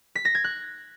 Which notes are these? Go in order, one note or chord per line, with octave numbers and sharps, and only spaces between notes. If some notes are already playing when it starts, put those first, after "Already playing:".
B6
A#6
G#6
F#6